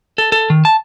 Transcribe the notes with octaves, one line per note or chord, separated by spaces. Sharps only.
A4
A4
D#3
A5